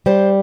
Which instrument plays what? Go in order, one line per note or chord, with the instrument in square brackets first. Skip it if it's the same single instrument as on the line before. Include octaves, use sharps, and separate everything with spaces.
[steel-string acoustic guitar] G3 C5